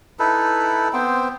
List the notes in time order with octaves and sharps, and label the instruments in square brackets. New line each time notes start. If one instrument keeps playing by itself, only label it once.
[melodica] D#4 E4 A4 B4
B3 C4 C5 G5